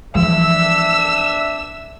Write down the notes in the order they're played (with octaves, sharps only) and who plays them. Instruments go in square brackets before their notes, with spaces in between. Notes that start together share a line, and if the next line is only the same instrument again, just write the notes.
[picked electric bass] E3 F3 G#3 [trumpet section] D4 E5 [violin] E6